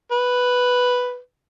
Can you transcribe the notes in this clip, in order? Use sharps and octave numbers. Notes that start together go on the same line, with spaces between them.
B4